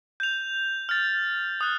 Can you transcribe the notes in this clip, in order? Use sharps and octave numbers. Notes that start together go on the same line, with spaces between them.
G6 F7
F6 A6
D#6 F#6